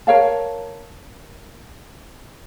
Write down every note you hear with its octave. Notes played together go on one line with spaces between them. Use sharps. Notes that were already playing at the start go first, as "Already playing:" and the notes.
A#4 C#5 F5 A5